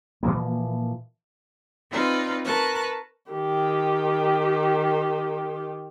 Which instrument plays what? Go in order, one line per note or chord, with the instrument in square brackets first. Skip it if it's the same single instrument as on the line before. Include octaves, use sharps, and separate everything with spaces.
[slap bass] A#2 E3 F3 A#3
[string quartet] C4 D#4 F4 B4 D5
A#4 B4 A5 C#6 F#6
[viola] D#3 G4